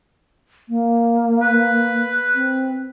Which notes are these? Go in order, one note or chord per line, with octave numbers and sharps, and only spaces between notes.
A#3
B4
C4